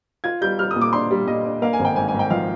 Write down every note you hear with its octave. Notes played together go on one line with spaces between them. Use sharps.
F4 G#6
G3 G6
G3 F6
A#2 D#6
D6
D4 C6
G3
A#2 D#5
D4
A#3 F5
G#5
G#1
G5
G#2 G#5
G#5
G#2
G5
F3 F5